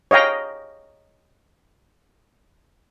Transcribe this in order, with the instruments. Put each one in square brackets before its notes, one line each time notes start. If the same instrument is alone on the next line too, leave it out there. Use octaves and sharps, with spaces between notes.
[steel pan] C#5 D#5 F5 G5 A#5